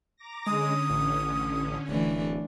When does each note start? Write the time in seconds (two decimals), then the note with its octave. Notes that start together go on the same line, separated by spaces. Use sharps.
0.16 A#5 D6 A#6
0.46 D3 G#3 C#4 D#6
0.89 A1
1.88 D1 E3 A3 D4